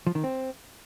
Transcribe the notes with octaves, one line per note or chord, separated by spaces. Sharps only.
F3
D#3
C4